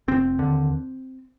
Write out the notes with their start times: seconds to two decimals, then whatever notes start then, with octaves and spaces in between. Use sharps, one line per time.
0.08 F1 C4
0.39 D#2 D3